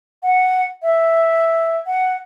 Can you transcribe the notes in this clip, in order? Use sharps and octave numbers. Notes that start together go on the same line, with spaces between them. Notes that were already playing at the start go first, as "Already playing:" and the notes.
F#5
E5
F#5